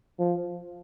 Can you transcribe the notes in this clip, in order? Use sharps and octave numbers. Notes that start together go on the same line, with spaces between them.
F3